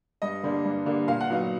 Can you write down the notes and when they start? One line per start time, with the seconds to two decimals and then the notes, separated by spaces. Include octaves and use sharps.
0.22 G2 D#5
0.43 D3 G3 A#3 D4
0.65 G2
0.86 D3 G3 A#3 D4
1.08 A#2 F5
1.21 F#5
1.30 F#3 B3 D#4 F5